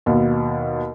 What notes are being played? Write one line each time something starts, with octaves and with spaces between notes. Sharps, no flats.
D#2 B2